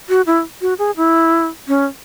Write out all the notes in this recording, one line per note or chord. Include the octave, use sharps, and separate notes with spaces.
F#4
E4
F#4
G#4
E4
C#4